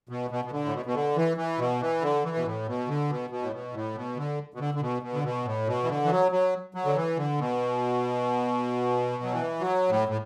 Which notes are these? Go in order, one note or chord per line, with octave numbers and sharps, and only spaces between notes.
B2
B2
B2
D3
A2
B2
B2
D3
E3
E3
B2
E3
D3
E3
B2
A2
B2
D3
B2
B2
A2
B2
A2
B2
D3
B2
D3
D3
B2
B2
D3
B2
A2
B2
E3
D3
E3
F#3
F#3
F#3
D3
E3
D3
B2
F#3
E3
F#3
A2
A2